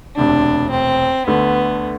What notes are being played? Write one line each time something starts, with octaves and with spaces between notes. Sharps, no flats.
E1 D2 C3 D4
C4
D2 D3 A3 B3